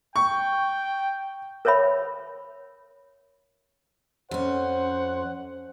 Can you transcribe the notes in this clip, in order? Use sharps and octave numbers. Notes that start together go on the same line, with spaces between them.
G5 C#6
A#4 C5 C#5 E5 B5
F2 C#4 C5 F#5